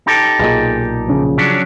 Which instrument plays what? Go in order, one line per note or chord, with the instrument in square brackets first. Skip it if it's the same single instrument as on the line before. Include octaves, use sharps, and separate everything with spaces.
[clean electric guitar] D#4 G4 A4
[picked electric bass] B1 A#2 [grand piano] G#4 D#5
[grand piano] C#3 F3
[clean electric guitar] F#3 C#4 D4